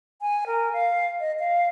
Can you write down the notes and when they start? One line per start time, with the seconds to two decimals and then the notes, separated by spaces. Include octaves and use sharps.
0.22 G#5
0.47 A#4
0.73 F5
1.20 D#5
1.39 F5